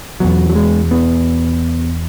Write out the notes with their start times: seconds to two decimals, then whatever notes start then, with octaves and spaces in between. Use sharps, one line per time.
0.20 E2 B2 F#3
0.50 F#3
0.55 G#3
0.91 B3